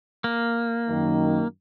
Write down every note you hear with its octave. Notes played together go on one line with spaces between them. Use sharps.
A#3
F#2 D#3